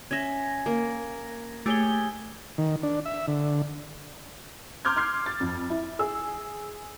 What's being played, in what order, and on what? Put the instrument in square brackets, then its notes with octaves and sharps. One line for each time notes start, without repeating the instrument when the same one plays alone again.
[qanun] C#4 E5 [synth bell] G#6 A#6
[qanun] A#3
[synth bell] A3 G7 [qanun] G4 G#4 C#5
[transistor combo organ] D#3
D4
E5
D3
[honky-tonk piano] A#5 C6 D6 F6 G6 G#6
C6 F6 G#6 C7
A6
F2
E4
G#4 E6